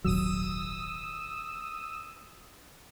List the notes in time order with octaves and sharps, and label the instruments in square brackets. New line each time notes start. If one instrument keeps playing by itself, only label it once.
[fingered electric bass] D#1 G#1 F#3 [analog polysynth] D#6 E6